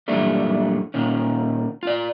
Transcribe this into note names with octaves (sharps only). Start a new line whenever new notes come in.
F#2 A#2 E3 G3 A3 D4
A#2 D#3 C#4
F4 D5